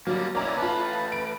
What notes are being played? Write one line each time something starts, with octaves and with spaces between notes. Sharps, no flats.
F#3 G3 A#3
A#3 C#4 E4 D5 A#5 D6
A3 F4 B4 A5
D7